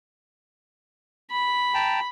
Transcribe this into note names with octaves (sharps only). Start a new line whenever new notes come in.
B5
G5 A5 A#5